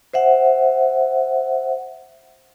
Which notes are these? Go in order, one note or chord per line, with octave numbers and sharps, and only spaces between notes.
C5 E5 F#5